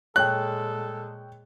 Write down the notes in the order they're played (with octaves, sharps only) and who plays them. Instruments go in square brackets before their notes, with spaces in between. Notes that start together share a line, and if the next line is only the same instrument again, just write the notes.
[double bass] A#2 G#3 [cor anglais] A4 [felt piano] C#5 G5 [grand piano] F#6